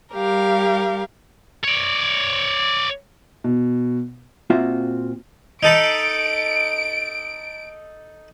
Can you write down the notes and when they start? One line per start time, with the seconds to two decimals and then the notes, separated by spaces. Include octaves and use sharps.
0.13 G3 G4 A#4 F5
1.64 C#5 D5
3.44 B2
4.50 A#2 C4 F4 F#4 E5
5.63 D#4 A4 B5 D7